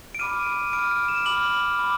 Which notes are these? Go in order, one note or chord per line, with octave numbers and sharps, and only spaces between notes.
D7
B5 D6 F6 D#7
D#7
B5 D6 F6 D7
D7
E7
B5 D6 F6 F#7
B5 D6